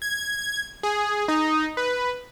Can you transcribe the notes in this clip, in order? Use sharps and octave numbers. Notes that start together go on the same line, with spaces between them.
G#6
G#4
D#4
B4